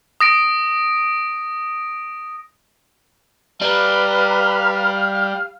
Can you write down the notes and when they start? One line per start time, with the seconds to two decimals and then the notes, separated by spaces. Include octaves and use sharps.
0.20 D#6 A#6 D7
3.61 G3 B4 F5 A#5